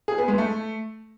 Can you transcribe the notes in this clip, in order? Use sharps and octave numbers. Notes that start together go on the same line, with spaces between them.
G#4
B3
G#3
A3